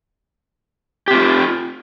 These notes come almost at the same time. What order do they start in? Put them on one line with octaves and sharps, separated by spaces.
G4 C4 F4